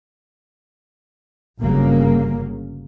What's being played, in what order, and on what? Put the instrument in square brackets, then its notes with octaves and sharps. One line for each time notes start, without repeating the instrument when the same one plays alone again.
[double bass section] G1 C#3 F#3 A#3